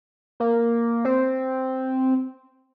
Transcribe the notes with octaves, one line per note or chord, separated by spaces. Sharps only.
A#3
C4